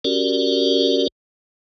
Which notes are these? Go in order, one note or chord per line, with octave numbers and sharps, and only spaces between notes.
C#4 F#4 G4 A#4 D5